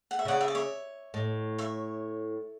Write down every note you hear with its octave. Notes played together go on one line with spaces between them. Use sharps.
F#5
E5
C#3 D5 F#5
E5
D5
C#5 E5
A2
C#5 E5